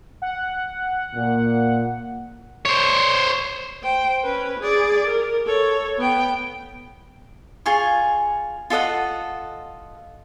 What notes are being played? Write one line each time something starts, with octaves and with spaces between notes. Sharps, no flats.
F#5
A#2
C5 C#5
C5 G5
C#4 B4
G#4 D5
A#4
A4 C#5
B3 G5
F4 G#4 G#5 C#6
F4 A4 D#5 F#5